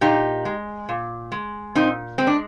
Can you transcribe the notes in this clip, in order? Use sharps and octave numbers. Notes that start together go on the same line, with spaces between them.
A#2 D#4 G4
G#3
A#2
G#3
A#2 C4 D#4
G#3 C4
D4